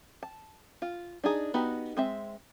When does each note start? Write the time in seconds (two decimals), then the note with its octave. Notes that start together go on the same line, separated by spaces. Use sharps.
0.23 A5
0.82 F4
1.24 D4 D#4 G#4
1.54 B3 D#4 F#4 G4
1.97 G#3 C4 E5